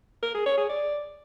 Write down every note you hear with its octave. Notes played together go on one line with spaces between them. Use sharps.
A#4
G#4
C#5
G#4
D5